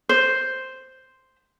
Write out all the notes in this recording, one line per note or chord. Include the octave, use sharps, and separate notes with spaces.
C5